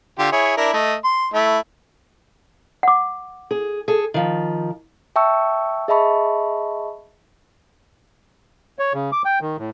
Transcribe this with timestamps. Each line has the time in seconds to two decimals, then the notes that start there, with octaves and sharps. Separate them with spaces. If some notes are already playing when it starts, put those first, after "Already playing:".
0.19 D3 F4 G4
0.32 E4 G#4 C#5
0.57 D4 E4 A#4
0.73 A3 D#5
1.04 C6
1.34 A3 E4
2.83 F#5 D6
3.51 G#4
3.88 G#4 A4
4.14 D#3 F3
5.16 E5 G5 A5 C#6 E6
5.88 G#4 D#5 E5 A5 B5 C#6
8.79 C#5
8.94 C#3
9.12 D6
9.25 G5
9.41 D#3
9.58 A2